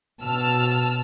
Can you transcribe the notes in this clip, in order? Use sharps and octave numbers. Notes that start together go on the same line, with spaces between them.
B2 A5 E6 F6